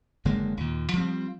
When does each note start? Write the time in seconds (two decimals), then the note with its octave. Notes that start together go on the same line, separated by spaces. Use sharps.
0.25 F#1 D3 G#3 A#3
0.57 D#2 A#2
0.93 F3 G3 C4